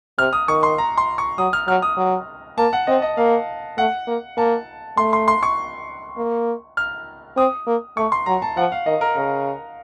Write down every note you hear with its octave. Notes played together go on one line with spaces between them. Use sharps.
C3 F6
D#6
D#3 C#6
C6
A#5
C6
C#6
F#3 D#6
F6
F#3 F6
D#6
F#3
A#3 A5
F#5
C4 D#5
D#5
A#3 F5
A3 F#5
A#3
A#3 A5
A3 C6
C6
C6
C#6
A#3
F6
C4 D#6
A#3
A3 C#6
C6
F#3 A#5
A5
F3 F#5
F5
D#3 D#5
A#4
C#3 A#4